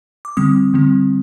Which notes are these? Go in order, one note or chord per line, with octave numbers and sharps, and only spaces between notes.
D6
D3 G3 C4 D#6
D3 G3 C4